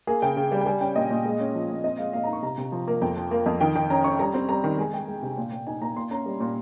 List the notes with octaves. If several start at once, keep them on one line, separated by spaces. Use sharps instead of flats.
A#3 G#4
C#3 G5
C#3
G3
G5
G3 G#5
C#4 G5
A#2 D#5
A#2
G#3
C#4
F3
A#2
C4 D#5
G#3 F5
A#2 F5
D#4 A#5
C#6
C3 A#5
C3
F3
A#3
F2 G5
F3
A#3
F2
D#3 G5
D#3 G5
C#4 A#5
C#4 C#6
G3 A#5
C4
G3 A#5
D#3
G#3 G#5
G#3 G5
G#3
C3
A#2
A#2
D#4 G#5
A#2 A#5
A#2 C6
C#4 A#5
G3
A#2